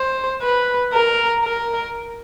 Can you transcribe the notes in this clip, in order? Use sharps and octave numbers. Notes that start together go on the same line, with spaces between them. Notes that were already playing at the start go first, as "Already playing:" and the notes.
Already playing: C5
B4
A#4
A#4